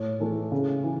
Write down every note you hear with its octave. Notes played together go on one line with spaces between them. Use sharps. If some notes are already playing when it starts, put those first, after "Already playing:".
Already playing: A2 C#5
E3 A3
C#3
E3